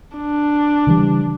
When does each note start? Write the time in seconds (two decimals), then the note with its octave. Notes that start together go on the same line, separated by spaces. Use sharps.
0.17 D4
0.87 C#3 E3 G3